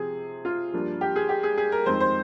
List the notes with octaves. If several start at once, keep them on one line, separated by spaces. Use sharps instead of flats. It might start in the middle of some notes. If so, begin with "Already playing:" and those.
Already playing: C3 F3 C4 G#4
F4
G2 F3 A#3 D4
G4
G#4
G4
G#4
G#4
A#4
F2 D#3 G#3 C4 C5
C5